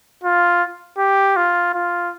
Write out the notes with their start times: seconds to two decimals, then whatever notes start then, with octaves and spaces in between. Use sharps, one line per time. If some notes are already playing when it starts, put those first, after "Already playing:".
0.24 F4
0.98 G4
1.37 F4
1.74 F4